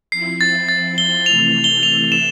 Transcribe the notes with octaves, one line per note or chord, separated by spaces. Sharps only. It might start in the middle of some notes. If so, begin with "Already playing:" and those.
F3 C4 E4 C7
A6
A6
G7
C3 E3 A3 F7
G7
F7
E7